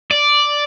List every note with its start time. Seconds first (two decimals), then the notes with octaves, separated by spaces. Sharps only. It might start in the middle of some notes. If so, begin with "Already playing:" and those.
0.11 D5